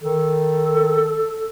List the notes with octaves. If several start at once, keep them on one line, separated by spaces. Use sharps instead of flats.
D#3 A4